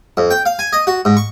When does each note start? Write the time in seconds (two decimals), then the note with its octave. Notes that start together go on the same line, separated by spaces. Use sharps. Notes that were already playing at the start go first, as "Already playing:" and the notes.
0.17 F2
0.31 G5
0.46 F5
0.59 G#5
0.73 D#5
0.87 F#4
1.05 G#2
1.17 C#6